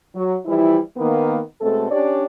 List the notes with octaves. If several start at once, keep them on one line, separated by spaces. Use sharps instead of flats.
F#3
E3 F3 G3 E4
D#3 A#3 B3
B2 G#3 A3 C4 A4
C#4 D4 G4 C#5 D5